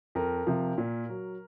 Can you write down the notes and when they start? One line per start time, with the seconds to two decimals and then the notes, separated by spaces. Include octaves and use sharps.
0.15 F2 A#4
0.47 C3 F3
0.78 A#2
1.09 F#3